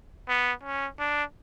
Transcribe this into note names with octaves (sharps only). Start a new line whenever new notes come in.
B3
C#4
D4